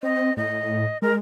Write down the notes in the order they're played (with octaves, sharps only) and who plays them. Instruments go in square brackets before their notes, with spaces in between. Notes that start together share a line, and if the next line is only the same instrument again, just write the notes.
[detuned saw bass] C4 [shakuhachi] D#5
[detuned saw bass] A2 [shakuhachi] D#5
[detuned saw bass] G#3 [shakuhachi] A#4